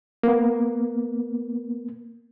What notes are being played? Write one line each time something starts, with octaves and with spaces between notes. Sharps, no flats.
A#3 B3